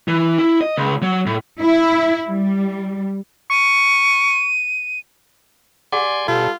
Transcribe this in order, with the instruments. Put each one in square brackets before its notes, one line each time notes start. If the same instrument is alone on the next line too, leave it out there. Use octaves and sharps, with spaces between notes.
[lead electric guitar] E3
E4
D#5
C#2
F#3
A2
[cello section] E4
G3
[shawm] C#6 [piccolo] D#7
[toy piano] G4 G#4 F#5 [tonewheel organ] D5 G#5 C6
[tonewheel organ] B2 [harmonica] G3 A4 [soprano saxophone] F4